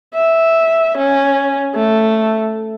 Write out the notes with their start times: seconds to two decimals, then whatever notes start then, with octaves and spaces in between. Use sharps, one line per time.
0.15 E5
0.98 C#4
1.75 A3